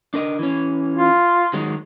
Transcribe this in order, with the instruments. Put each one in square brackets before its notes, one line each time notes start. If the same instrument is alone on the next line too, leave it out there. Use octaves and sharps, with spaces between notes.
[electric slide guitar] D4 A#4 D#5
E3 C#4
[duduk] F4
[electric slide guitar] D#3 F#3 G#3